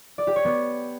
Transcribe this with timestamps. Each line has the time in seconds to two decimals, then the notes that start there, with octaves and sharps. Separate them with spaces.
0.18 D5
0.27 G4
0.36 C#5
0.45 B3